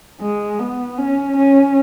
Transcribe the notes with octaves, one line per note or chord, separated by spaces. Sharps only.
G#3
B3
C#4
C#4